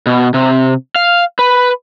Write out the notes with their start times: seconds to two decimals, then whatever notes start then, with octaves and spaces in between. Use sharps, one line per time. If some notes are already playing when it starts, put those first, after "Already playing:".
0.06 B2
0.34 C3
0.96 F5
1.39 B4